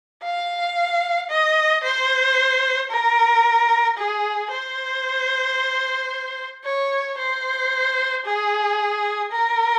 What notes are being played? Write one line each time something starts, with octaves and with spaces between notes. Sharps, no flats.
F5
D#5
C5
A#4
G#4
C5
C#5
C5
G#4
A#4